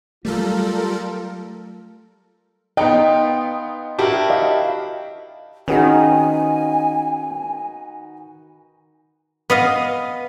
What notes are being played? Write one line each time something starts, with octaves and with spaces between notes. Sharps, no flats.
F#3 G3 A3 F4 A4 A#4
B3 D#4 F4 D#5 G5
D4 E4 F#4 G4 A#4
D#5 F5
D#3 C#4 D#4 F#4 G#4 B4 G#5
B3 D#5 F5